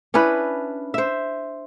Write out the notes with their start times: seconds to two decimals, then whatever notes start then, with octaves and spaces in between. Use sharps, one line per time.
0.14 C#4 D4 E4 B4
0.94 C5 E5